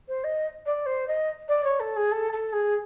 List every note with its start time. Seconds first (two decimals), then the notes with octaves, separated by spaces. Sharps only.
0.08 C5
0.24 D#5
0.66 D5
0.86 C5
1.07 D#5
1.48 D5
1.64 C#5
1.80 A4
1.96 G#4
2.11 A4
2.32 A4
2.53 G#4